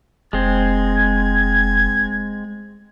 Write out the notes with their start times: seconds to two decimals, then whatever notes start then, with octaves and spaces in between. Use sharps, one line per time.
0.33 F1 G#3 C4 G#6